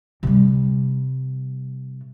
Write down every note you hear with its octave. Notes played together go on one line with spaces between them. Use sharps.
C3 G3